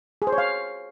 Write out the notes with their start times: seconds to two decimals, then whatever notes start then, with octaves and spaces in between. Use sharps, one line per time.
0.22 G#4
0.27 C5
0.33 C#5
0.38 F5